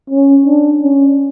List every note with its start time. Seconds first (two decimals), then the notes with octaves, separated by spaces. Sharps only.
0.10 C#4
0.46 D4
0.82 C#4